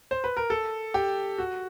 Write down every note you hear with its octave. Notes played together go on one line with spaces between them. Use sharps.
C5
B4
A#4
A4
G4
F#4